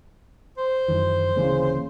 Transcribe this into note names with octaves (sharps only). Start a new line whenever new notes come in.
C5
F#2 D#3 E3
D1 C#3 E3 A#3